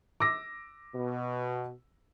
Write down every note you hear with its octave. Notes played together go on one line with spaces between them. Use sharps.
D6 E6 A#6
B2